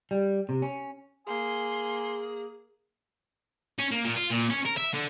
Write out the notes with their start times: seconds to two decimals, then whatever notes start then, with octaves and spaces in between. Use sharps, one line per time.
0.11 G3
0.49 C3
0.62 C#4
1.27 A#3 G#4 G#5 C6
3.79 C#4
3.91 A#3
4.05 A#2
4.16 F4
4.31 A#2
4.50 C#4
4.65 A#4
4.77 E5
4.93 D3